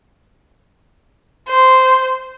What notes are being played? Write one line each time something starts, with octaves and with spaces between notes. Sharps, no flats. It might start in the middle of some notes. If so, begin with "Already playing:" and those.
C5